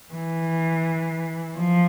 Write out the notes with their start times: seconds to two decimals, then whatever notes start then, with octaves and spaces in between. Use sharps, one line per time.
0.13 E3
1.57 F3